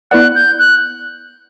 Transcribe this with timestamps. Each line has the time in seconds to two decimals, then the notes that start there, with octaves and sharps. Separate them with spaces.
0.11 B3 E4 B4 D5 F#5 F#6
0.35 G6
0.59 F#6